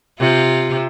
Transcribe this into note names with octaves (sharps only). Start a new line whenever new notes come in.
C3 F4